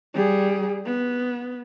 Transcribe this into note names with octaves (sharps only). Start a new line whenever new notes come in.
G3 G#4
B3